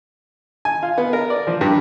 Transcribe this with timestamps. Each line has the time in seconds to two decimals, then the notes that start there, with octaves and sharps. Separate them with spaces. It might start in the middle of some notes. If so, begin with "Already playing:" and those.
0.65 G#5
0.83 F4
0.98 B3
1.13 A#4
1.30 D5
1.47 F3
1.61 G2